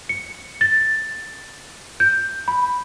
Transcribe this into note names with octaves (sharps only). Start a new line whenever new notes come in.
C#7
A6
G6
B5